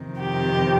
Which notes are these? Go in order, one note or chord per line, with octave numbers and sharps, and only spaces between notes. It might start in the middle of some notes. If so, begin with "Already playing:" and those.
Already playing: F2 C3 D#3
G4